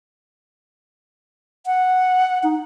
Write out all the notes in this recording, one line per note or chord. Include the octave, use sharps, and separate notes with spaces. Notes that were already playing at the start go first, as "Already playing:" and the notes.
F#5
D#4